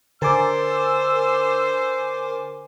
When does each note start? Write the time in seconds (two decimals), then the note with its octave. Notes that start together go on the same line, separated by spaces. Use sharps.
0.22 D3 A#4 C5 G#5 D6 E6 A6 C7